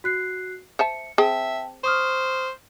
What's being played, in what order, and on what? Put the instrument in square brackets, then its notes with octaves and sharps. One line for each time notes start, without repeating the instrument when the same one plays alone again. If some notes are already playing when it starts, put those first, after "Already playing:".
[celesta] F#4 F#6 C7
[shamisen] C5 E5 A5 [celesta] C#7
[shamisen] C4 G#4 [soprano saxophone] E5 [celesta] G5 A5
[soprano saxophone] C5 [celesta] C#6 D#6 F6